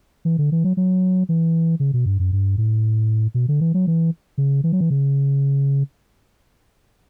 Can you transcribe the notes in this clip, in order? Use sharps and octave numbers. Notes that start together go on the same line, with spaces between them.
E3
D3
E3
F#3
F#3
E3
C#3
B2
G2
F#2
G2
A2
B2
D3
E3
F#3
E3
C#3
E3
F#3
E3
C#3